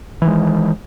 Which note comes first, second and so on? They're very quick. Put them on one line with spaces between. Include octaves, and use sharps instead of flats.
E3 D#3 G#3